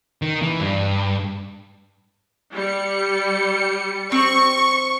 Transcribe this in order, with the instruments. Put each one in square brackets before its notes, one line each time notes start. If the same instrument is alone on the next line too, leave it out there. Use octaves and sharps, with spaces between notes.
[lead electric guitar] D#3
E3
G2
[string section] G3 C#7
[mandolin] C4 [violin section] C#6